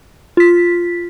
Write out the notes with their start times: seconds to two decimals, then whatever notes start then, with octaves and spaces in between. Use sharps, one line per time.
0.37 F4 B6